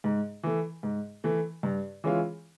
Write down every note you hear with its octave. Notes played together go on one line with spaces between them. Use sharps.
G#2
E3 A3
G#2
E3 A3
G2
E3 G#3 C#4 F4